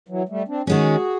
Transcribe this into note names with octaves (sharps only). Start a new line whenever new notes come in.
E3 F#3
G3 A3
C4 D4
D#3 G#3 C#4 F#4 G#4